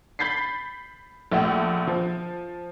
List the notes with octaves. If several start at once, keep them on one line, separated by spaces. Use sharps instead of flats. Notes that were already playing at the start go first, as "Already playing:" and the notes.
B5 G6 A6 B6 C7
A#1 A3 F#5 G5
F3